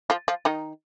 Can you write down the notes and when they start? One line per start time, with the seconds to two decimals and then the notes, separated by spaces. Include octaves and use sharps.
0.10 F3 F4
0.28 F3 F4
0.45 D#3 D#4